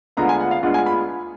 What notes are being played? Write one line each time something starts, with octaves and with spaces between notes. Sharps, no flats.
D2 D3 G#3 B3 F4 A#5
G#5
F#5
F5
D2 D3 G#3 B3 F4 F#5
G#5
B5